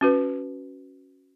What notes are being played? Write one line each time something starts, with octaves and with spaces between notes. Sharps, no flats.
C#4 F#4 B4